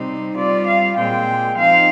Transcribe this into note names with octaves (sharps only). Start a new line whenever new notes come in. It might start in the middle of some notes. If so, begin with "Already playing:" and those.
Already playing: C3 G3 C4 D#4
G3 C4 F4 D5
F5
A#2 G#3 C4 G5
F3 C4 D#4 F5